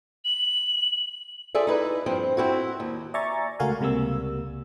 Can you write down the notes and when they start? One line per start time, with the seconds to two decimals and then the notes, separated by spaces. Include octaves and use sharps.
0.25 F#7
1.55 F4 G#4 A4 D5 E5
1.67 D#4 E4 B4
2.06 G2 F3 C4
2.37 C4 E4 F#4
2.80 D#2
3.14 D5 E5 G#5 A#5 C#6 A6
3.59 C#2 A3 F#4 A#4 F5 G#5
3.81 C#2 C3 G3 A#3 E6